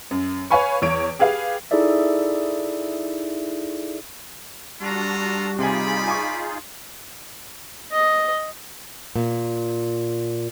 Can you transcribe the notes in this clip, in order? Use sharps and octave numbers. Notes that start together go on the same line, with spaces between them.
F#2
B4 C#5 F5 G#5 B5 C#6
E2 C#5 D7
G4 G#4 B4 F5
D#4 E4 G#4 A4 D5 E5
G3 D4 F4 F#4 A4 A#5
C3 D#4 F4 G#4 D5 G#5 B5
G#5 C#6
D#5
A#2